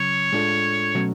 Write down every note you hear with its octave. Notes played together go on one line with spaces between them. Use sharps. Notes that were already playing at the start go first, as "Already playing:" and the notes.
Already playing: C#3 F#3 C#4 C#5
A2 G#3 D4 F4 A4
B2 F#3 A3 C#4